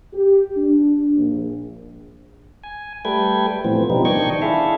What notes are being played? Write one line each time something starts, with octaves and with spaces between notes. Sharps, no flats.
G4
D4
A#1
G#5
G3 A3 A4 B4 G5 G#6
A2 E3 F3 B3 C4
B2 F3 G3 B3 C4 D#4
D#3 D4 D#5 G5 C#6 G#6
D4 E4 G#4 A4 E5 F5